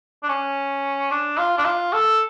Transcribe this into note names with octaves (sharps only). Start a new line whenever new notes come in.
D4
C#4
D4
F4
D4
F4
A4